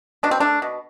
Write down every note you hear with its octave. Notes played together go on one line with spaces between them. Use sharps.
B2 D4
C4
A3 D4
B2